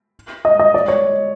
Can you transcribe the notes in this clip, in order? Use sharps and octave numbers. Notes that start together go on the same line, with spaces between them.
D#5
D#5
D5
C#5